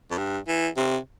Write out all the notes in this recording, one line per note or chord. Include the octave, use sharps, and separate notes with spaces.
F2
G2
E3
C3